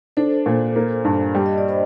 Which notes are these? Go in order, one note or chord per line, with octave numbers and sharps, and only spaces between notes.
D4 A4 C5
A#2
A#3
G2
G3
D#5
D5
C5 D#5